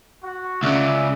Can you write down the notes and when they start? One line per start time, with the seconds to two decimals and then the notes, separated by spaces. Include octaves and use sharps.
0.24 F#4
0.63 C#2 C#3 D5 E5